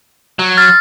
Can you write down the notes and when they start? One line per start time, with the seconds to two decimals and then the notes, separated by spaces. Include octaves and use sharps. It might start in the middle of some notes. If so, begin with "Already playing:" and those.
0.39 F#3
0.57 F6 A6